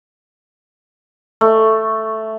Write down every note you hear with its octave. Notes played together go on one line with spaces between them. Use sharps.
A3